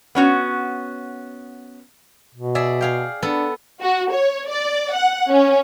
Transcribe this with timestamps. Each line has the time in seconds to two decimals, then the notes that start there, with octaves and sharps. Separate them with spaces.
0.15 B3 C#4 F#4
2.35 B2
2.55 G#4 D5 E5
2.81 G#4 F5 G5
3.22 B3 D4 A4 F#5
3.81 F#4
4.11 C#5
4.48 D5
4.93 F#5
5.30 C#4